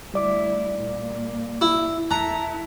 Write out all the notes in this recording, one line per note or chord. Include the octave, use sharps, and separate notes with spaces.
D2 G3 E4 D5 D6
A#2 A#3
E4
E2 E4 A4 A5 A#5 F#6